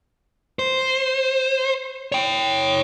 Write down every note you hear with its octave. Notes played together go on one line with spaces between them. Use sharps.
C5
C#5 G5